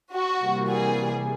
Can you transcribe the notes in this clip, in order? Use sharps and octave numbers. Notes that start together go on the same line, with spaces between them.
F#4
C3 E3 G3 A#3
G#4